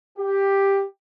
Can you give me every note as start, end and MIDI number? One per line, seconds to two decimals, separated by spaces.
0.18 0.84 67